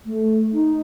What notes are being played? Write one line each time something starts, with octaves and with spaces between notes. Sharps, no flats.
A3
D#4